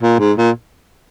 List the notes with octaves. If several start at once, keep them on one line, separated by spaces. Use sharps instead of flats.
A#2
G#2
A#2